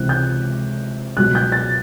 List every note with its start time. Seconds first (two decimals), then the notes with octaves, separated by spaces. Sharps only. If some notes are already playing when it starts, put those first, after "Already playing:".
Already playing: C#2 C3 E3 F#6
0.09 G6
1.17 C#2 B2 F#3 F#6
1.35 G6
1.52 A6